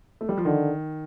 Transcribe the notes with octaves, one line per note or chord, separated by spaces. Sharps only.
A3
G3
F3
D3 D#3